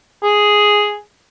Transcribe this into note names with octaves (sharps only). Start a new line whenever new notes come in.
G#4